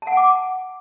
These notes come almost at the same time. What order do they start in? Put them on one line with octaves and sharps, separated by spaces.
A5 F#5 G#5 D6